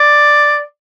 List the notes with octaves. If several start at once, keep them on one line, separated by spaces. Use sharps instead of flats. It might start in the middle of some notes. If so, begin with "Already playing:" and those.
Already playing: D5